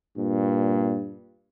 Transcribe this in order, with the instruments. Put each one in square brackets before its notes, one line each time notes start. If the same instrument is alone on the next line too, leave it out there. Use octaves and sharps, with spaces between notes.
[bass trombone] G2 [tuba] A#2